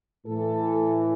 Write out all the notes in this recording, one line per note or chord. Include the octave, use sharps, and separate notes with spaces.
A2 E3 A4